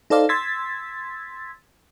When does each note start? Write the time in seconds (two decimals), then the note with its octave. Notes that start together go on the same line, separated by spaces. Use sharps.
0.10 D#4 A4 C5 D5 F5
0.29 C6 E6 G#6 A6 B6